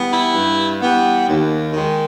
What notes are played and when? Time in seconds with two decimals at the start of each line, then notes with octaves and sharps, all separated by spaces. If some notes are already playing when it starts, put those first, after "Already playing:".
Already playing: E3 G3 B3
0.11 E4
0.34 G2
0.81 E3 G3 B3
1.27 D#2
1.73 D#3 G#3